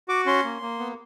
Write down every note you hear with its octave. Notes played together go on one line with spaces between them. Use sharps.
F#4 D6
C#4 C6
A#3
A#3
B3